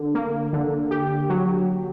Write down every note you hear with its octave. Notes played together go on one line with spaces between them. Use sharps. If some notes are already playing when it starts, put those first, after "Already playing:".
Already playing: D3
A#3
D3
G4
F#3